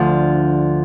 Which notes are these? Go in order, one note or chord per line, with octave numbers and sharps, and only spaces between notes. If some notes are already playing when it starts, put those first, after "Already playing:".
Already playing: D2 D3 F3